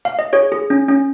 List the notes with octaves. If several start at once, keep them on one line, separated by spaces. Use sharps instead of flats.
F5
D#5
G#4 C#5
G#4
C#4
C#4